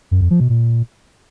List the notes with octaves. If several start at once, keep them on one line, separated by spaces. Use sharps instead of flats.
F#2
F2
F3
B2
A#2